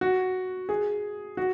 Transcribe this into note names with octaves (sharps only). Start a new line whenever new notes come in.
F#4
G#4
F#4